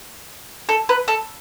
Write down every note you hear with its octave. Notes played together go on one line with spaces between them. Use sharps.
A4
B4
A4